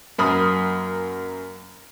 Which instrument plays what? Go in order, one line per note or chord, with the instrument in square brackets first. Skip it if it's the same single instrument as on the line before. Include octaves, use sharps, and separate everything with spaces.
[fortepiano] F#2 A#3 B5 D#6 F6